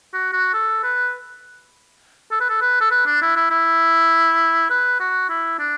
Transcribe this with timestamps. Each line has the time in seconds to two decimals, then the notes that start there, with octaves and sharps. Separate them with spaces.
0.13 F#4
0.33 F#4
0.53 A4
0.83 B4
2.31 A4
2.40 B4
2.49 A4
2.61 B4
2.81 A4
2.91 B4
3.06 D4
3.21 E4
3.36 E4
3.50 E4
4.70 B4
5.00 F#4
5.29 E4
5.58 D4